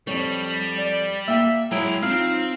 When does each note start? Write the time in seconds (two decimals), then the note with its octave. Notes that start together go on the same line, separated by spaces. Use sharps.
0.07 F2 G3 C#5
0.78 D5
1.28 A#3 E5 G5
1.71 F#3 G#3 E4 G#4 G5
2.03 C4 D#4 F4 F5